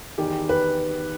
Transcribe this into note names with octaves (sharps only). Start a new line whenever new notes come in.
E2 D#3 G4
B4